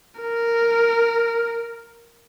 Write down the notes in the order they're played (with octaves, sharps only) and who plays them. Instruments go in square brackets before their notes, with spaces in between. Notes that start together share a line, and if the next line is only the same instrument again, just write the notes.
[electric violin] A#4